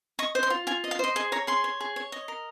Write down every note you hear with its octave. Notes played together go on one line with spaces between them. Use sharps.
D#5 C#6
C5
C6
F4
F4 G#5
D#5
F5
C5 D#5
G#4 D#5
C#5 A#5
G#4 C6
C#5
G#4
C#5
D#5
A#4